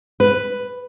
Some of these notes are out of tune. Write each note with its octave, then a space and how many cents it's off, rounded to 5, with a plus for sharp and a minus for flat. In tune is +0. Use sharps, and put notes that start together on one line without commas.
B4 +5